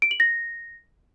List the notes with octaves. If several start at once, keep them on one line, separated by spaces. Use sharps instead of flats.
D7
F#7
A#6